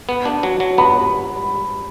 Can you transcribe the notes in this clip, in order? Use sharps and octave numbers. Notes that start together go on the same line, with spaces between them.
B3
D4
F#3
F#3
B3 B5